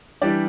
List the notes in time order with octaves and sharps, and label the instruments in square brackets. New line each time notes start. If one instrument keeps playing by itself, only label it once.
[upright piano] E3 G3 D4 G4 D5